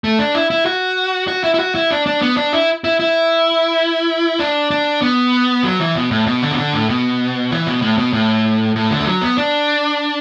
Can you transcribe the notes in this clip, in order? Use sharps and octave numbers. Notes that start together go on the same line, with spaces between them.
A3
D4
E4
E4
F#4
F#4
E4
E4
F#4
E4
D4
D4
B3
D4
E4
E4
E4
D4
D4
B3
F#3
E3
B2
A2
B2
D3
B2
D3
A2
B2
E3
B2
A2
B2
A2
A2
D3
A3
F#3
B3
D4